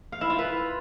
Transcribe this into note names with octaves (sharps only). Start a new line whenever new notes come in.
F5
E4
F4
B4